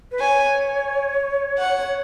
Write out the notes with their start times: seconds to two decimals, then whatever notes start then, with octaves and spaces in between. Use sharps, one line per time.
0.12 B4
0.20 C#5 G#5
1.58 F#5